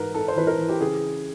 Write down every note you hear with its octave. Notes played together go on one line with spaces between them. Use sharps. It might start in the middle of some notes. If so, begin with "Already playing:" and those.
Already playing: G#2 E3 A#4 B4
G#2 A4
C5
E3 B4
A#4
E3
G4
C#3 G#4